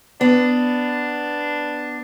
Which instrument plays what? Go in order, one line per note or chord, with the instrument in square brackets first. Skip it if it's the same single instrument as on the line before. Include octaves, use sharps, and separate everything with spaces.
[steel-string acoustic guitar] B3 [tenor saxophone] D4